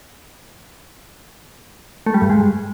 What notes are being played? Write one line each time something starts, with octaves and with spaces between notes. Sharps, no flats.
A3
G3
G2
G#3